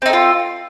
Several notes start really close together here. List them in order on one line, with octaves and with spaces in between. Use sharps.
C4 D#4 A4 F4